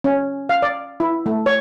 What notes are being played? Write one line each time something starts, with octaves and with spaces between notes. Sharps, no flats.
C#4
F5
D5
E4
A3
C#5